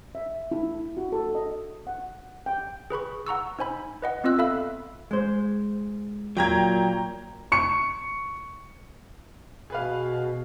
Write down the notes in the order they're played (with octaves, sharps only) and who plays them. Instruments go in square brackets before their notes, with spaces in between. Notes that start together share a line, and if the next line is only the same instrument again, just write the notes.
[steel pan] E5
E4
F#4
A4
D#5
F#5
G5
[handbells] G#4 B4 B5 C#6
F#5 A#5 C#6 E6
D#4 C5 G#5 B5
B4 D#5 F#5
B3 C4 F4 D#5 E6 F#6
A4 E5 F5 B5 E6
[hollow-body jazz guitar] G#3 C5
[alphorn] A#2 [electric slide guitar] F#3 [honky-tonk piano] G5 A#5 G#6
[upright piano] C#6 C#7
[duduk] B2 [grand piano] G#4 B4 F5